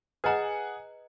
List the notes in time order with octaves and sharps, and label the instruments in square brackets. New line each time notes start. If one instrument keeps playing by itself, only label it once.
[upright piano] G#4 F#5 G#5 [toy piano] B4 D#5 A#5